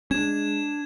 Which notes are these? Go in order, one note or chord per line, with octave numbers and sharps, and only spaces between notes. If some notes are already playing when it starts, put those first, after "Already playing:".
G#3 C#4 D4 G#6 E7